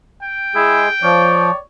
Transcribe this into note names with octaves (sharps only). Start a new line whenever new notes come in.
G5
G#3 E4 G#4
F3 C#5 D5